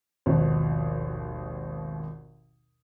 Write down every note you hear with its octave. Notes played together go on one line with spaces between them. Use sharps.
G#1 D#2 B2 F3